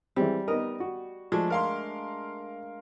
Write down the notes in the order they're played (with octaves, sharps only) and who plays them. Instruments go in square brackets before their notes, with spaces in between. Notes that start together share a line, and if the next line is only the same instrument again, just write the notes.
[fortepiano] E3 G#3 C4 [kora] G3
[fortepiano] B3 D#4 A#4 [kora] D#5
[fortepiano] F#4
[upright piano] F3 [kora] G#3 A3 D4
[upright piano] A#4 F5 C6